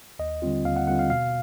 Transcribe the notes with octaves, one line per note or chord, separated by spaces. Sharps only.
D#2 D#5
D3 G3 C4 F4
D#2 F5
F#5
D3 G3 C4 F4 F#5
F5
B2 F5